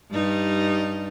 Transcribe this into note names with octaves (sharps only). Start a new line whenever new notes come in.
G2 G3 D#4